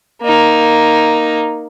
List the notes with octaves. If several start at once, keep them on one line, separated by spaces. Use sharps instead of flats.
A#3 D#4